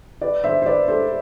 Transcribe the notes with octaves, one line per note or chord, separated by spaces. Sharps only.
B4 D5
C5 E5
C5
B4 D5
A4 C5